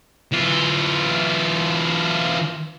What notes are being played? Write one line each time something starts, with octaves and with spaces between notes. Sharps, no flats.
E3 F4